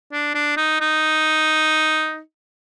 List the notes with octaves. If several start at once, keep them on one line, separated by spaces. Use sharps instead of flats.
D4
D4
D#4
D#4